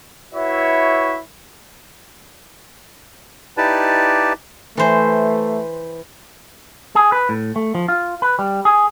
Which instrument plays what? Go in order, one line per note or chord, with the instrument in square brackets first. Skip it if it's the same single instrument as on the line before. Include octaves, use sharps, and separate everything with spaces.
[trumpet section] E4 F#4 B4 C#5 E5
[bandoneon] D#4 E4 G4 B4 D5 A5
[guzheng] E3 C5 [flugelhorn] A3
[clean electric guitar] G#4
B4
A2
A3
F3
F4
B4
G3
G#4